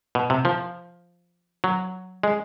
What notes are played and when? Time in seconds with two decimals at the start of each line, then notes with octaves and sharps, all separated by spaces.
0.15 B2
0.30 C3
0.45 F3
1.64 F#3
2.23 G#3